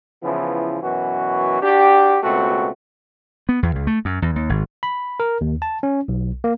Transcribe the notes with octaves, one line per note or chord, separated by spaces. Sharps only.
C#3 E3 F3 B3 E4
F#2 B2 E3 F#4
D4 F#4 G4
C#2 B2 A3 C4 F#4
B3
E2
C#2
A3
F#2
E2
D#2
G#1
B5
A#4
D#2
A5
C#4
B1
A#3